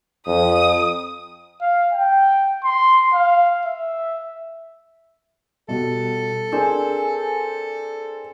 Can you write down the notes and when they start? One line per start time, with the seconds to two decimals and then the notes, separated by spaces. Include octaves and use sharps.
0.27 F2 D#6
1.61 F5
1.92 G5
2.64 C6
3.14 F5
3.65 E5
5.68 B2 G3 A4
6.52 C4 D4 G#4 A#4 C5